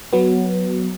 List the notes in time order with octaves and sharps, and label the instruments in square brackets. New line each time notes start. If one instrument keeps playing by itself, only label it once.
[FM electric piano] F#3 B3